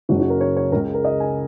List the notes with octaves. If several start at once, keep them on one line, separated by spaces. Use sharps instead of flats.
F#1 F#2 C#3 F#4
F#4
A#4
C#5
C#5
C#2 C#3 A#4
A#4
D#5
G#5